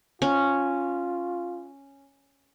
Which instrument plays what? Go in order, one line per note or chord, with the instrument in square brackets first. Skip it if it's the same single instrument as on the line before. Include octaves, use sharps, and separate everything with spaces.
[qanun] C#4 [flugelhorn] F4